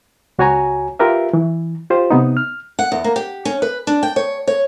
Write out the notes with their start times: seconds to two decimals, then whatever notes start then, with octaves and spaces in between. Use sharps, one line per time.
0.39 C#2 F#4 C#5 G#5 A#5
0.99 F4 G4 A#4 B4 E5
1.33 E3
1.90 F4 G4 C5
2.11 C3 B3 D#4
2.37 F6
2.79 F#5
2.92 E2
3.04 A#3
3.16 G4
3.45 C#4
3.62 B4
3.87 D4
4.03 G5
4.16 C#5
4.47 C#5